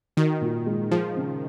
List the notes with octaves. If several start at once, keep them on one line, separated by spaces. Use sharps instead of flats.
D#3 F#4
A#2
G#3
F3 G#4
C#3